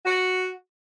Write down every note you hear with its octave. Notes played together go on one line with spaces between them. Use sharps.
F#4